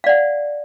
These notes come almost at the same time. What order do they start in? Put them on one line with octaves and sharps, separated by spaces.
F5 D5 F#5